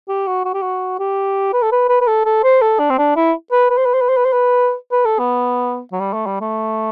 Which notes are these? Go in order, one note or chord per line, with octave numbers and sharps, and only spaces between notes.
G4
F#4
F#4
G4
F#4
G4
B4
A4
B4
B4
B4
A4
A4
C5
A4
D4
C4
D4
E4
B4
B4
C5
B4
C5
B4
C5
B4
C5
B4
B4
A4
B3
F#3
G3
A3
G3
A3